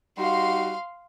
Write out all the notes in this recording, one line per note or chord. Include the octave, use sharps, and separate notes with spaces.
G3 D#4 F#4 F5 C6